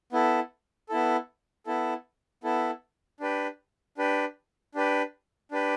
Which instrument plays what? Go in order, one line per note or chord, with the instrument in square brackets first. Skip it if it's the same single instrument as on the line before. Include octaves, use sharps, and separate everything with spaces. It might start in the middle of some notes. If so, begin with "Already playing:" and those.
[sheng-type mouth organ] B3 E4 A4
B3 E4 A4
B3 E4 A4
B3 E4 A4
D4 G4 B4
D4 G4 B4
D4 G4 B4
D4 G4 B4